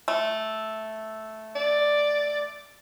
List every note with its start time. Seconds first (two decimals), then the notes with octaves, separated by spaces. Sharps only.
0.08 A3
1.55 D5